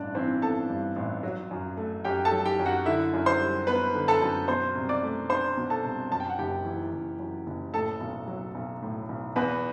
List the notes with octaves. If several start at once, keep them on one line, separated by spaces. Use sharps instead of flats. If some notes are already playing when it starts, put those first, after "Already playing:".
Already playing: A1 G2 D4 D5
E3 C4 C5
B3 A4 A5
G2
A1
F#3
F#2
A3
F#2 G4 G5
A4 A5
F#3
G4 G5
F#2
F#4 F#5
D3 E4 E5
F#2
C5 C6
G3
B3 B4 B5
D3
A4 A5
F#2
B2 C5 C6
C2
D5 D6
A3
D4 C5 C6
B2
A4 A5
C2
F#2 A5
G5
F#5
F#1 G4 G5
E3
F#1
F#2
F#1
A2 A4 A5
B1
F#3
B1
A2
B1
E2 B4 B5